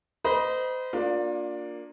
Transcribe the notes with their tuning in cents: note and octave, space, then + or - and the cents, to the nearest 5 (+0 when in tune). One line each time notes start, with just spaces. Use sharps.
C5 -35 D#5 +0 B5 -40
A#3 +0 D4 +0 F4 +30